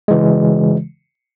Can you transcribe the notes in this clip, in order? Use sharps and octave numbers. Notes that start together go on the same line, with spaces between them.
C#3 E3 G#3